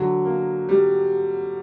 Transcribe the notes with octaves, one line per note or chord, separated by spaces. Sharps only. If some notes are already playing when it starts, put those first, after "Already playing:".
Already playing: D3 F#3
A#3
G3